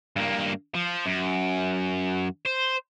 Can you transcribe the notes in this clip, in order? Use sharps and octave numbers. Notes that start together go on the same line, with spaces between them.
G2 A#3
F3
F#2
C5